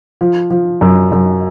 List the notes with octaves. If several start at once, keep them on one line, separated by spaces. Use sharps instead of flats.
F3
F3
F#2
F#2